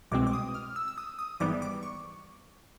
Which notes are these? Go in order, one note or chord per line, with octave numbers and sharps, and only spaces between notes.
C2 B2 G#3 C4 D6
D6
D#6
F6
E6
E6
D#6
D#6
G#1 G#2 E3 G3 B3 D6
D6
C#6